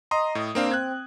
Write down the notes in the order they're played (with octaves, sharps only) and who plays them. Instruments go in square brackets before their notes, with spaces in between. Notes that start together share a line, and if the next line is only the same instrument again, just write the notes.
[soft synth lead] D#5 [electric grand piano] A#5 C6 D#6
[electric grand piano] A2
[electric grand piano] A#3 C4 F5 [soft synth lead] D4
[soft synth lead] C4 [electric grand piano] F#6 G#6